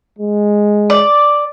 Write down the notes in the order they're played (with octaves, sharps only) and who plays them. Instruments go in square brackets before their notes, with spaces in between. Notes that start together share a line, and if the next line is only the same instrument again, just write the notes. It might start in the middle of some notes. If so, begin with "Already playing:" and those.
[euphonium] G#3
[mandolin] D5